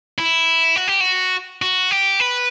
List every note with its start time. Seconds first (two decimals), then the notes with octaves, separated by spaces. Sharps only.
0.18 E4
0.76 F#4
0.88 G4
1.01 F#4
1.62 F#4
1.91 G4
2.20 B4